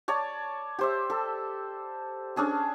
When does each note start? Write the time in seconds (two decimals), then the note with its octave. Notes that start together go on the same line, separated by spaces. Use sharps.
0.08 C#5 D5 A5
0.79 G4 C5 E5
1.10 A4
2.36 C#4 D4 G#4 A5